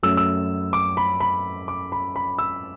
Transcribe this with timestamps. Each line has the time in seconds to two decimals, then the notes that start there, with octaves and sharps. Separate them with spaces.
0.03 F#2 F#3 A3 E6
0.17 E6
0.73 D6
0.97 B5
1.20 B5
1.68 D6
1.92 B5
2.16 B5
2.39 E6